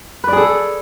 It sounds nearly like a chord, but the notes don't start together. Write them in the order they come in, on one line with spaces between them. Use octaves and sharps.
B4 D5 G#4 A4